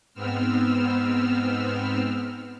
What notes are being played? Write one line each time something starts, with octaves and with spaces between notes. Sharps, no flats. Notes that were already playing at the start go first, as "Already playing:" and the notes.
G#2 B3 C4 E6 F6